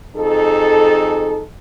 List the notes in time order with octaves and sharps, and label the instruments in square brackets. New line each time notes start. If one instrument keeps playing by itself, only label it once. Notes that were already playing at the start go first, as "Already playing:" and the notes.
[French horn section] F2 D#4 G#4 A4